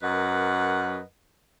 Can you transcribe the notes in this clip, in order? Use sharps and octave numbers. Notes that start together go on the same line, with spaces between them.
F#2 A#4 B4 D#5 F#5